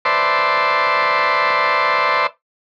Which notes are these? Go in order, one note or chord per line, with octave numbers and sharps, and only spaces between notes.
B4 C5 D5 E5 A5 C6